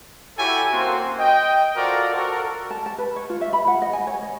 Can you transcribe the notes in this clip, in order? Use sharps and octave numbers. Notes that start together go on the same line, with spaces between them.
E4 F#4 G4 A4 C#5 G#5
A#3 C4 C#4 F#4 C5
D#5 G5
F4 F#4 A4 A#4 C5 D5
F#4 A4 A#4
A5
A5
B4
C#5
F4
E5
B5
F#5
D#5
G#5
C#5
D#5